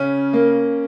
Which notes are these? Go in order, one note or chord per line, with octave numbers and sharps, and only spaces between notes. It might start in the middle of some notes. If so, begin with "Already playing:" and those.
Already playing: C#3 C#4
A#3